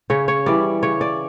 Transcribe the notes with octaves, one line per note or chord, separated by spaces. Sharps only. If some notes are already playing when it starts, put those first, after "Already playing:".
C#3 C#5
C#5
E3 G3 D5
C#3 C#5
D5